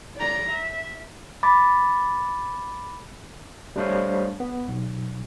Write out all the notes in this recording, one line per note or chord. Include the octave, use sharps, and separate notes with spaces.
D5 A#5
E5
B5 D6 A6
G3 A3 D4 C5 C#5 F5
B3
B1